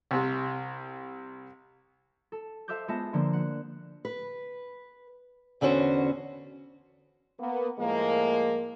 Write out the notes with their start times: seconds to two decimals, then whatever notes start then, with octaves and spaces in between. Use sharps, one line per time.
0.11 C2 C3
2.32 A4
2.68 A4 C5 E5 F5 D6 G6
2.88 G#3 B3 F4 E5 A5 A#6
3.13 D3 F3 A#3 D4 C5
3.33 F#5
4.05 B4
5.61 E2 D3 B3 C#4 F#4 C5
7.39 A#3 B3
7.79 A2 F3 G#3 A#3